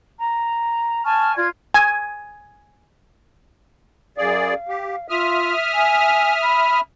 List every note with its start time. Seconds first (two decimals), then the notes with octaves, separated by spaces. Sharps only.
0.18 A#5
1.03 G#5 A5 C#6 F6
1.36 F4 D5 G#6
1.74 G#5
4.18 F#2 G#4 D5 F5
4.69 G4
5.09 F4 E5 D#6 F6
5.74 G#5
6.42 B5